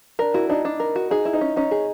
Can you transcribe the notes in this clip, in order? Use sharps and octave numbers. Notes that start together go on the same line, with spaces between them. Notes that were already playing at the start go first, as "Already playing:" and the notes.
D4 A#4
E4 F#4
D4 D#4
D4
A#4
F#4
D#4 G#4
E4
D#4
C#4
C#4 D#4
G#4